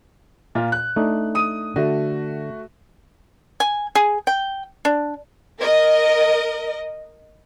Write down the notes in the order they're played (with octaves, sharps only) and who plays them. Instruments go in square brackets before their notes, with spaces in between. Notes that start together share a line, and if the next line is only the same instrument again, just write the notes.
[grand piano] A#2 F4
F#6
[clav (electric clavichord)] A3 D4 D#4
[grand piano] D#6 D#7
[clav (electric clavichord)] D3 [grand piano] A3 F#4
[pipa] G#5
G#4
G5
D4
[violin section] A#4 D#5